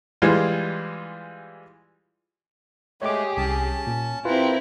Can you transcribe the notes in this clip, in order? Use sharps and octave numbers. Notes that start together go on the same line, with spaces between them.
E3 G3 G#3 F4
G#3 A3 G4 G#4 C#5 D6
C2 C#4 A5
A#2
C4 E4 F4 G4 A#4 B4 A#5